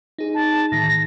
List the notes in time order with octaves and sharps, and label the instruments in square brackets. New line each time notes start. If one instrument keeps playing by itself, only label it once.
[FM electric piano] D#4 G#4
[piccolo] A5
[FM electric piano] A2 D#3 [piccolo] A#6